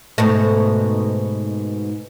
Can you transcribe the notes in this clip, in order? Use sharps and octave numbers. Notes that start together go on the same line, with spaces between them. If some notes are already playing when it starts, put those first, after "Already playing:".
G#2 B2 A3